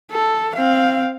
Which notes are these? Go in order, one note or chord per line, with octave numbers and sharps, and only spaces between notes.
A4
C4 F5